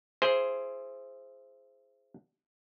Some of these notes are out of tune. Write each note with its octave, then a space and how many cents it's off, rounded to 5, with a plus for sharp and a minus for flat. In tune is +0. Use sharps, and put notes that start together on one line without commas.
E4 +25 G#4 +0 C5 +0